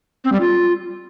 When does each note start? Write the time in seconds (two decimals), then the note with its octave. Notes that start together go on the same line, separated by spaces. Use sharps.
0.24 C4
0.32 G3
0.40 F4